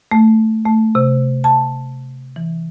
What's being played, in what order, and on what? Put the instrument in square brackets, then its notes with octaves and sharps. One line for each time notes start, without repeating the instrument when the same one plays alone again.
[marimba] A3
A3
C3
A5
E3